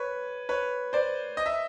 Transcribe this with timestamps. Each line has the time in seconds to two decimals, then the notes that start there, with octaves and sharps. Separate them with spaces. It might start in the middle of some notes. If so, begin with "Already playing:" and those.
Already playing: B4 C#5
0.49 B4 C#5
0.93 C5 D5
1.37 D#5
1.46 E5